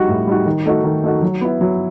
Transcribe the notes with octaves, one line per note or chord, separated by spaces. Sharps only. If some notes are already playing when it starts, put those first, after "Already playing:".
Already playing: G3 D#4 F#4
A2
G3 D#4 F#4
D#3
A3 D#4 F#4
D#3
A3 D#4 F#4
F#3
B3 E4
F#3